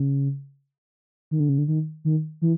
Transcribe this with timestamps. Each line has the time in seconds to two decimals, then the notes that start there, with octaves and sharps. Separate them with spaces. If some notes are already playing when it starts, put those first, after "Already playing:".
Already playing: C#3
1.31 D#3
1.40 D3
1.49 C#3
1.58 D3
1.68 D#3
2.05 D#3
2.42 E3